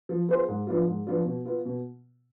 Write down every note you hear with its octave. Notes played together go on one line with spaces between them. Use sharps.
F3
B3 F4 G#4 C5
G#2
F3 B3 D4 F4
G#2
F3 B3 D4 F4
B2
B3 F4
B2